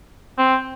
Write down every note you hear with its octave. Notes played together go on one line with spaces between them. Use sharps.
C4